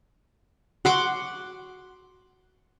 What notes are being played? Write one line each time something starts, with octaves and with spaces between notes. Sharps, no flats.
F#4 F#5 C6 D6